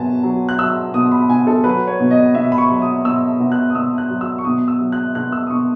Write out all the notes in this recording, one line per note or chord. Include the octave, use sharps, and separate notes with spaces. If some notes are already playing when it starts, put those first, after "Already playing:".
Already playing: B2 F#3 B4 G#5 A5
F#3
F#6
F#3 E6
B2 D#6
B5
B2 G#5
A4
F#3 B4
C#5
B2
D#5
B2 E5
B5
C#6
F#3
D#6
B2 E6
B2
F#6
D#6
B2 E6
F#6
F#3
E6
C#6
B2 D#6
E6
F#3
F#6
B2 F#6
E6
D#6
B2 C#6